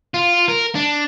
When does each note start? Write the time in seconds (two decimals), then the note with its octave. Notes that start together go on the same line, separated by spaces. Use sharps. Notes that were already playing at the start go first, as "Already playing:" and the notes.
0.14 F4
0.48 A#4
0.75 D4